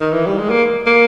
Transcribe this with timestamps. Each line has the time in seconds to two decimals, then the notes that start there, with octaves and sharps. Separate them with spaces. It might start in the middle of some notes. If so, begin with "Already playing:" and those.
0.01 D#3
0.13 E3
0.26 G3
0.38 G#3
0.50 A#3
0.86 A#3